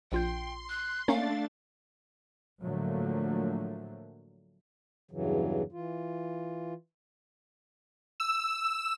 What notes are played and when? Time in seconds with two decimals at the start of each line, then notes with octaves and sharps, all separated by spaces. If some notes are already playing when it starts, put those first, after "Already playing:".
0.12 A#1 F4 G5 C6 G6
0.69 F#6
1.08 A3 A#3 C#4 D4 F5 A6
2.63 A2 D3 F3 F#3 A3 A#3
5.11 E2 G2 C#3 E3 F#3
5.72 E3 F4
8.20 E6